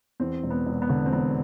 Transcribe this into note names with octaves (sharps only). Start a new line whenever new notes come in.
E2 C4
E1
B3
E1
B3
D3
C4
E1 B3